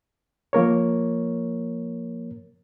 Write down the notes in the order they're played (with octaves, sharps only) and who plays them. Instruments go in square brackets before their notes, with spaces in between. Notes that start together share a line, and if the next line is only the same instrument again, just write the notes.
[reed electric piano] F3 A#3 A#4 C#5